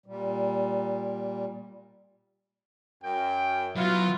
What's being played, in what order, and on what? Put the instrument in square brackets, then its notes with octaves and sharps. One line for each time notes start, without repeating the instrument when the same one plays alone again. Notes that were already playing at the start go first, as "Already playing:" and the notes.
[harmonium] A#2 G3
[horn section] F#2 G5
[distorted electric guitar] F#3 [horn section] B3 E4 F4